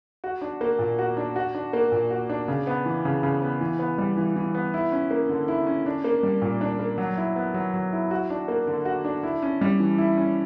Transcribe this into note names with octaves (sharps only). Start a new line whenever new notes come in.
F#4
D4
A#3
A#2
F#4
D4
F#4
D4
A#3
A#2
F#4
D4
C#3
B3
E3
C#3
C#3
B3
E3
B3
G3
E3
E3
B3
E4
C#4
A#3
D3
E4
C#4
D4
A#3
G3
A#2
D4
A#3
F#3
E4
B3
F#3
F#3
E4
F#4
D4
A#3
D3
F#4
D4
E4
C#4
G3
E3
E4
C#4